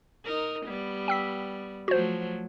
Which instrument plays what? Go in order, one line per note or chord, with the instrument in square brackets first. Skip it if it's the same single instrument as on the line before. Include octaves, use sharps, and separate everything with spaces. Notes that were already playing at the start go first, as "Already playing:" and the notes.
[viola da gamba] D#4 A#4
G3 B3
[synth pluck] G5 E6 B6
[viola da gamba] F3 F#3 A3 [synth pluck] F#4 C5